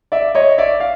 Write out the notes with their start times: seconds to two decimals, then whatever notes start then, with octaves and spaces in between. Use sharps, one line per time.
0.12 D5 E5
0.35 C#5 D#5
0.58 D5 E5
0.80 F5